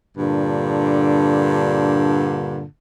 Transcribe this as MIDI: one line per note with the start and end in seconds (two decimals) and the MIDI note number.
0.17 2.64 43
0.17 2.64 46
0.17 2.64 50